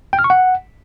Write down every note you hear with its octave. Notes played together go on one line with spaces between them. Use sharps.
G5
F6
C#6
F#5